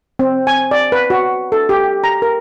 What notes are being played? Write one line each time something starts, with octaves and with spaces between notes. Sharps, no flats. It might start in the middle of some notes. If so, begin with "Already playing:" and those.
C4
G#5
D5
B4
F#4
A4
G4
A#5
A#4